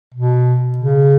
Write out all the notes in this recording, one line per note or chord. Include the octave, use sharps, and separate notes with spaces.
B2
C#3